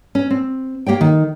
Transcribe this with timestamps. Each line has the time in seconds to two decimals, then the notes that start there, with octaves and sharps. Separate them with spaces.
0.15 C#4
0.30 C4
0.86 A#3 G4 C#5 G5
1.01 D#3